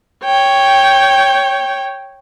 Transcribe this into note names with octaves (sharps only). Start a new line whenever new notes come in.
C#5 G5